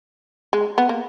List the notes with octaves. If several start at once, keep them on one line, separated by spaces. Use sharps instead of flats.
G#3
B3
A#3